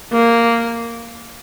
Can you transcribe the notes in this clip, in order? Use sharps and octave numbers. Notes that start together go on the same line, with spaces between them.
A#3